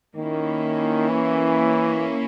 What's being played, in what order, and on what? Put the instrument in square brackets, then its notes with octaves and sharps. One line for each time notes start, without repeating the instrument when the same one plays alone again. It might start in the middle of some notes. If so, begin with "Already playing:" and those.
[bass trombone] D#3 [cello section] A#3 C#4 E4
[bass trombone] E3